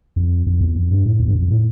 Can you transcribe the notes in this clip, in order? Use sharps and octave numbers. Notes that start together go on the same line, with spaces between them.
F2
F2
E2
F2
G2
A2
E2
G2
F2
A2